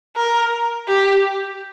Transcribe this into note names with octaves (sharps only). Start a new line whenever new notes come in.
A#4
G4